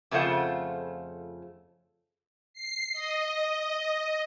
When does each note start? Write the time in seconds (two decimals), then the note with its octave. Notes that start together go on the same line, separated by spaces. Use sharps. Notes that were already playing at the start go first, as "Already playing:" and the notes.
0.11 F2 C#3 A3 F4 C5 F#5
2.53 C7
2.93 D#5